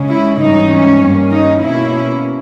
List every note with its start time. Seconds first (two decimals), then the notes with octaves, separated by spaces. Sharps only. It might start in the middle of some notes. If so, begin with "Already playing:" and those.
Already playing: C#3 G#3 C#4
0.10 E4
0.40 G#2 E3 G3 C#4 D#4
0.70 C#4
1.01 G2 D#3 A#3 C#4
1.31 D#4
1.62 B2 A#3 C#4 E4